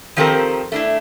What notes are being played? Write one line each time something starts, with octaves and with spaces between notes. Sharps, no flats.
D#3 F3 C4 G4 A4 A#4
A3 D4 E4